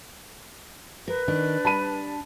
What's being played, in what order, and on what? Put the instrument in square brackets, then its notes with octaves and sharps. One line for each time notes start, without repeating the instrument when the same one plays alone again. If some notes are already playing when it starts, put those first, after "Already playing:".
[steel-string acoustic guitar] A#4 [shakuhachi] B4
[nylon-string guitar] D#3 [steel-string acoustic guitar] D4
[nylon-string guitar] G3 [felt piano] A5 B5 D#7